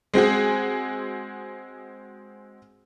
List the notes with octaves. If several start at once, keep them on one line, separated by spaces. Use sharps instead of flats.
G#3 C4 F#4 G#4